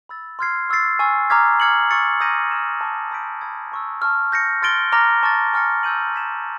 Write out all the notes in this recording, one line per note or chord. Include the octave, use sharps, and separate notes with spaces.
B5 E6 A6
C6 F6 G#6 C7
C#6 E6 A6 C7
G#5 C#6 E6
A#5 D6 F6 G#6 B6
D6 F6 G#6 C#7 F#7
A#5 C#6 E6 A6 C#7
A#5 D#6 G6 A#6 D#7
E6 G#6 C#7 E7
A5 C#6 F6
B5 D#6 G6 B6 D7
B5 D#6 G#6
A5 C#6 E6
A5 C#6 F6
G6 A#6 C#7
C6 F6 A6 D7 G7
A#5 D6 F6 A#6
A5 C#6 F6 A6
G#5 C#6 F6 A6 C#7
E6 G6 A#6 D#7 F#7
F6 G#6 B6 E7